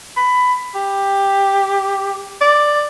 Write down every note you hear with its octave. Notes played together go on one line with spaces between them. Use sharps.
B5
G4
D5